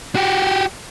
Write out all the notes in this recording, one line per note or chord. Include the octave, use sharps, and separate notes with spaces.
F#4 G4